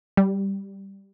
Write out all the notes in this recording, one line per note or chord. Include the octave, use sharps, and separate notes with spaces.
G3